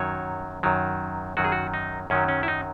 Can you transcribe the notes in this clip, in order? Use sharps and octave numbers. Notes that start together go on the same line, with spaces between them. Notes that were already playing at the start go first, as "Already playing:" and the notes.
Already playing: F#2 D#3 F#3 C#5
F#2 D#3 F#3
F#2 D#3 F#3 F#4
G#4
F#4
D#4
F#2 D#3 F#3 C#4
C#4
E4
D#4